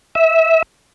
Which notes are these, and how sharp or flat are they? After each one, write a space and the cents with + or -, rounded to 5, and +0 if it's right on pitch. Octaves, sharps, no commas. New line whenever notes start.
E5 -20